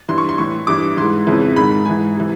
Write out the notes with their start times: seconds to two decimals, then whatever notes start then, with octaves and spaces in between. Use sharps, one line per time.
0.09 G2 E3 C6
0.18 C#6
0.29 C6
0.38 A2 E3 C#6
0.67 G2 E3 D6
0.97 G#2 E3 C6
1.27 F2 C#3 E3
1.56 G#2 D#3 B5
1.85 G#2 E3 G#5
2.17 C3 E3